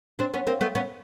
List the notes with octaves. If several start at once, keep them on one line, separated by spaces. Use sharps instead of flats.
C4 D4
B3 C#4
A#3 C4
A3 B3
B3 C#4